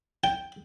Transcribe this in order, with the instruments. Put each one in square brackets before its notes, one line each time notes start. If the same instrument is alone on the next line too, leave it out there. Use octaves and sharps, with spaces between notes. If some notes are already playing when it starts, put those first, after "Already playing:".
[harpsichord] G5